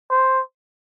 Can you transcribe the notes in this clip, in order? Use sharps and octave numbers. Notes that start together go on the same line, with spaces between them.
C5